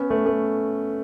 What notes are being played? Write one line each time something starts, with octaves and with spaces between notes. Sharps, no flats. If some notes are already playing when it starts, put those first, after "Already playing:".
Already playing: B3 C#4
A3
A3